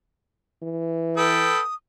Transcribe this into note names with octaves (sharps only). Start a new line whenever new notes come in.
E3
A4 B4 G5 D#6